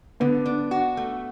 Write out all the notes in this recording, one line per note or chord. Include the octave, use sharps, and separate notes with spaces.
D3 B3
D4
F#4
A3